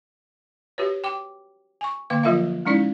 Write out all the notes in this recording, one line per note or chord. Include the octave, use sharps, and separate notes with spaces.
F#4 G4 B4 C#5
G5 D6
G#5 C#6
D3 A#3 F5 D6
F3 F#3 F4 A#4 E5 F5
G#3 C#4 D#4 E4 D5